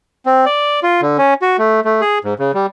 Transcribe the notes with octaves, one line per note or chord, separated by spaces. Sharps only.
C4
D5
F4
D3
C#4
F#4
A3
A3
G#4
G#2
C#3
G3